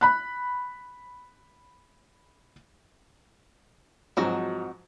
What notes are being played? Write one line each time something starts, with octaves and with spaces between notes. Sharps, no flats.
B5 F#6
G#2 F3 F#3 C4 F#4 D#5